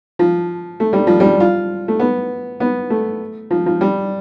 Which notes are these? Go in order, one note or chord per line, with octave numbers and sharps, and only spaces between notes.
F3
A3
G3
F3
G3
F4
A3
B3
B3
A3
F3
F3
G3